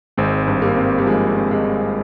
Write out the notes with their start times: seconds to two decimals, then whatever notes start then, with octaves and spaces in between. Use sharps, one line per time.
0.17 G#1 G#3 C4
0.48 G2
0.62 G3 A#3
0.76 C4
0.98 G3
1.07 F3 G#3
1.36 C4
1.51 G#3
1.66 C4